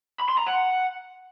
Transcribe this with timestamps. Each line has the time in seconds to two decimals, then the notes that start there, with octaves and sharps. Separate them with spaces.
0.20 B5
0.29 C6
0.38 A#5
0.47 F#5